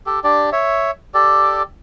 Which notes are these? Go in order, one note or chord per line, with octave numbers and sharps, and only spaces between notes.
G4 A4
D4 G4 D5
C#5 E5
G4 A4 D5